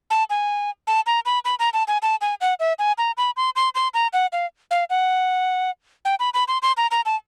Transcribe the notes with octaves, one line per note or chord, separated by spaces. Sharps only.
A5
G#5
A5
A#5
B5
B5
A#5
A5
G#5
A5
G#5
F#5
E5
G#5
A#5
B5
C6
C6
C6
A#5
F#5
F5
F5
F#5
G5
B5
B5
C6
C6
A#5
A#5
A5